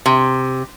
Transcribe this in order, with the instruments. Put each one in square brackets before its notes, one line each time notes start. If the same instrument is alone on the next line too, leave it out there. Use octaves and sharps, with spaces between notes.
[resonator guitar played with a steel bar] C3